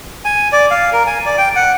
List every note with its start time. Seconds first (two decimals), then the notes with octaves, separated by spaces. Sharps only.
0.25 G#5
0.53 D5
0.71 F5
0.93 A#4
1.07 G#5
1.26 D5
1.38 G5
1.56 F#5